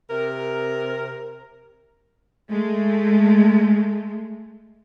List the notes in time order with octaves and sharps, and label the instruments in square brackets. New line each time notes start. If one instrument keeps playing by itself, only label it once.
[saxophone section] C3 A#4
[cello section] G#3 A3